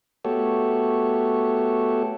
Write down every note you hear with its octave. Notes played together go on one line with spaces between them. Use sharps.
A3 B3 F#4 G4 A4 C#5